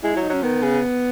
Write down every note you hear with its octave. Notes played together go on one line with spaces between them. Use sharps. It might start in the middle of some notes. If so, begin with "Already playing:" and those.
G#3 E4
F#3 E4
D#4
F#3 C#4
D#3 B3
C#3